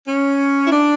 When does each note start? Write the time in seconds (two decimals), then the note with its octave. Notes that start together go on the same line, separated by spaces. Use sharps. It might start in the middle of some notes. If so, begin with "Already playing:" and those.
0.07 C#4
0.67 E4
0.72 D4